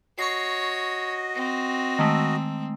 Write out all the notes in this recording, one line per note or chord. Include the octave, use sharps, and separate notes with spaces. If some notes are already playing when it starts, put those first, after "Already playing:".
F#4 C#5 D#5 C#6 C7
C4
D#3 G#3 A3